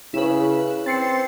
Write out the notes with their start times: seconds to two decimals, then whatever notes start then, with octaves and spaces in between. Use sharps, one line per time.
0.14 C#3 E4 B4
0.86 C4 A6 C7 C#7